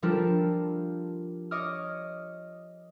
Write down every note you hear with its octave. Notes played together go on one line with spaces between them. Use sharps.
F3 G3 D4 F4 A4 A#4
C#5 D#5 D6 D#6 F6